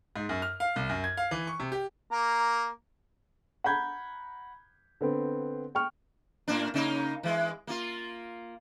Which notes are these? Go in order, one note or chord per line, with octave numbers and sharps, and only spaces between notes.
G#2
F#2
F6
F5
C2
F#2
G#6
F5
E3
C#6
C3
G4
A#3 A#5
F#5 A#5 B5 G6 G#6
D3 B3 C4
G5 C#6 F6
A2 A#3 D4
C#3 A#3 D#4
E3 G#3
A#3 F4